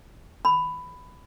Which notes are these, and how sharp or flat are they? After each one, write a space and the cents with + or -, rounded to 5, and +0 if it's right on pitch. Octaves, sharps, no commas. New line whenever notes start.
B5 +10